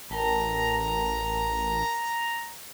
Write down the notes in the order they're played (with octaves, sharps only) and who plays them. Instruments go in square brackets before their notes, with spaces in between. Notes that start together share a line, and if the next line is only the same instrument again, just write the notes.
[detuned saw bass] A1 [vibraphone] A#4 G5 A5 [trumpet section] A#5